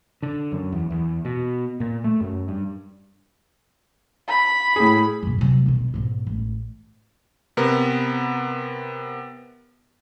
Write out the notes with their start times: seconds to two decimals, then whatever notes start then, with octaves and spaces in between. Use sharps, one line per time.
0.22 D3
0.52 F#2
0.72 E2
0.90 E2
1.25 B2
1.80 A#2
2.04 A3
2.21 F#2
2.48 G2
4.29 B5
4.76 A2 G#4
5.23 F#2 A#2
5.39 C3 F#3
5.66 B1 D#3
5.94 B1 G#2
6.27 A1
7.57 C3 B3 A#4